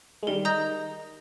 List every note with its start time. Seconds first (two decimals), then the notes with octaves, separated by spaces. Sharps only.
0.23 G#3
0.27 D#3 G3 A#4
0.45 D#5 A#5 D#6 G6